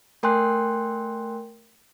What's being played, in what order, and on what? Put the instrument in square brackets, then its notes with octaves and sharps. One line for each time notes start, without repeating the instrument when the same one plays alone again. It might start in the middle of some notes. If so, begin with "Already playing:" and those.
[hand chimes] A3 A#4 G5 G#5 C6 F#6